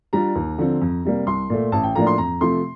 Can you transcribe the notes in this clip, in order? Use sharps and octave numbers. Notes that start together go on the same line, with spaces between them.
G3 D4 F4 A#5
D#2
D3 F3 C4
F2
C3 G3 A#3
C2 C6
A#2 A3
A1 A5
G5
A2 F3 A#3 D4 A#5
C6
F2 A#5
C3 F3 A3 C6